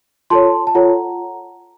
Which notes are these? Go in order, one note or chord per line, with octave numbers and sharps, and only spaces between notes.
F4 A4 C#5 A5 C6
A5
F4 A4 C#5 F#5 A#5